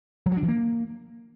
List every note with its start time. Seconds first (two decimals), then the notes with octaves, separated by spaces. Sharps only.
0.26 F#3
0.31 F3
0.37 D4
0.43 E3
0.48 A#3